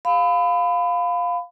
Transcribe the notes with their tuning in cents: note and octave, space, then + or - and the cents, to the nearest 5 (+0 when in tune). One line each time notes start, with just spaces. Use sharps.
F5 +10 B5 +25